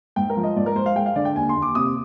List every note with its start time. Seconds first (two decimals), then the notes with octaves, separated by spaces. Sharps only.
0.16 G#2 G5
0.30 A#4
0.37 F3
0.43 D#5
0.56 G#2 D5
0.66 A#4
0.76 G#2 C5
0.86 F5
0.96 G#3 G5
1.06 F5
1.15 D3 D5
1.25 G5
1.36 D#2 G#5
1.49 C6
1.56 D#2
1.62 D6
1.75 C3 D#6